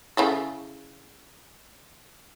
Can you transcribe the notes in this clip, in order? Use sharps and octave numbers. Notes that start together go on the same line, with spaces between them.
C#3 E4 A4